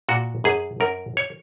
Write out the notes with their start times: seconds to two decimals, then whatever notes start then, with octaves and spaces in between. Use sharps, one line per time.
0.09 A#2 F#4
0.44 F#2 G#4
0.80 F#2 A#4
1.17 C#5